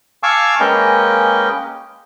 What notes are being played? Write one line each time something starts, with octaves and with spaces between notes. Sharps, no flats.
F5 G#5 A5 C#6 D6 E6
G#3 A#3 C#4 B4 D#5 G5